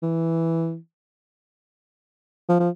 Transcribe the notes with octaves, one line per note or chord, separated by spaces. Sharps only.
E3
F3
F3